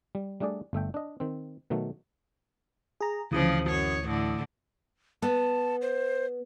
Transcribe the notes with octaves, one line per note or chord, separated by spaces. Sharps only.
G3
G3 A3 D4 G#4 D5
G1 A3 E5 G5
D4 D#5
D#3 C4
B2 D#3 F#3 A3
G#4 A#5
D2 C#3 E3 F3 D#6
F#2 C#5
A2 D3
B3 A5
C5